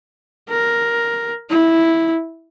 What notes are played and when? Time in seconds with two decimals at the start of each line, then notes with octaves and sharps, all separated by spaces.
0.49 A#4
1.50 E4